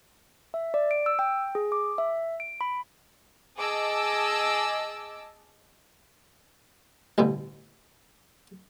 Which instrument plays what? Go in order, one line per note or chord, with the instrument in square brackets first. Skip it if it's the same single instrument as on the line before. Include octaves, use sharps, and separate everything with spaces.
[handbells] E5
D5
D7
E6
G5
G#4
D6
E5
D7
B5
[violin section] G#4 D#5 A5 D6 E6
[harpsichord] A1 D2 G2 B2